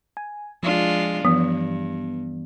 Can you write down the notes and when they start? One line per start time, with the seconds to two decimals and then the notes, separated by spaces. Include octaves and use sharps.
0.17 G#5
0.63 F3 G#3 D4 F4
1.25 G2 E3 F3 B3